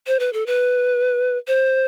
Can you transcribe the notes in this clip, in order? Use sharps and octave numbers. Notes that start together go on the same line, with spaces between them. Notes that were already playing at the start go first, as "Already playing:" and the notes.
C5
B4
A4
B4
C5